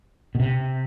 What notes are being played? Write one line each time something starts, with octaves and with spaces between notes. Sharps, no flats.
B2
C3